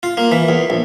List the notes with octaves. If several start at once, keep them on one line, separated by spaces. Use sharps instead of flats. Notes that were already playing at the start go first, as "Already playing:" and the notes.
F4
A#3
E3
E2
A#1